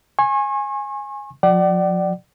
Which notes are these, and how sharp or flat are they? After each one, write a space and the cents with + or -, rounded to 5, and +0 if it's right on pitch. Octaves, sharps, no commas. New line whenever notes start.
G#5 -5 C#6 -40
F3 +40 D5 +15 F#5 +40